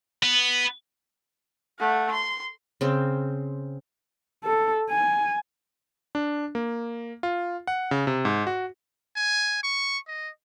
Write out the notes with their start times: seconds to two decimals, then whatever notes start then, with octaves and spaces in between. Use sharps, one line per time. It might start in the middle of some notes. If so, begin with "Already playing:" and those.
0.23 B3
1.79 A3 F#5
2.11 C6
2.81 C#3 C4
4.44 A4
4.89 G#5
6.15 D4
6.55 A#3
7.23 F4
7.67 F#5
7.91 C#3
8.07 C3
8.25 G#2
8.47 F#4
9.16 G#5
9.63 C#6
10.08 D#5